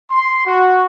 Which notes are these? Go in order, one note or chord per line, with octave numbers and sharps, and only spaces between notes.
C6
F#4